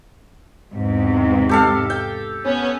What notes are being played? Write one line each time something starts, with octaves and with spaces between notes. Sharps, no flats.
E2 G#2 C3
G4 A4 F5
G5
B3 C#4